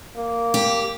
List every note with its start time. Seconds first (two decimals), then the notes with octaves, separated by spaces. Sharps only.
0.16 A#3
0.54 G4